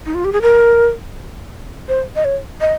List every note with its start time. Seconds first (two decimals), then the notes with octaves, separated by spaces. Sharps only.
0.06 D#4
0.14 F4
0.24 G4
0.32 G#4
0.42 A#4
1.88 C5
2.15 D#5
2.25 C#5
2.61 D#5